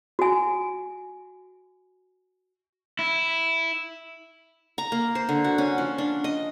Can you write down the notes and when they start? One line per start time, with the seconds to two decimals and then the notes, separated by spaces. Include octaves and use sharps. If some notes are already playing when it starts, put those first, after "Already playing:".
0.19 F#4 G#5
2.99 E4
4.78 A#5
4.92 A#3
5.15 C5
5.29 D3
5.44 F#4
5.58 C#4
5.78 F3
5.98 D4
6.24 D#5